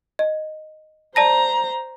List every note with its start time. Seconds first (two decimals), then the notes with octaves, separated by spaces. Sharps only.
0.19 D#5
1.16 C5 D5 A5 A#5 A#6